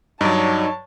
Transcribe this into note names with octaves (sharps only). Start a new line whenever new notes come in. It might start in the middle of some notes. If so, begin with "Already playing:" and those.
G2 F#3 D#4 C#5 D5 A5